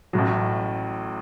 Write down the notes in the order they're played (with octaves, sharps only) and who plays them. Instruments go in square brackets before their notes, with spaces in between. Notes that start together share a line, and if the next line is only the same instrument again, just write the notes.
[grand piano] A1 A2 F#3